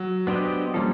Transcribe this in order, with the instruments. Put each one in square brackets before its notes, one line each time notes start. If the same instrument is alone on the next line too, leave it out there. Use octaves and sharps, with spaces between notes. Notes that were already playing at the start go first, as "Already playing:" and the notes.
Already playing: [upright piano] F#3
[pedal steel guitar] B3 D4 G4 C5 D#5
[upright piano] F3 [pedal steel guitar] G3 A#3 C#4 F4 A4